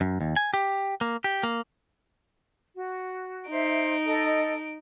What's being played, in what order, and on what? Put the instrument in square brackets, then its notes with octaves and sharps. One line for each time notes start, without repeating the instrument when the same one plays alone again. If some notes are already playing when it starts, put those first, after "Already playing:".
[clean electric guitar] F#2
D#2
G#5
G4
A#3
G4
A#3
[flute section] F#4
[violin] D#4 D7 [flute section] C5 E5
[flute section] A4 D#5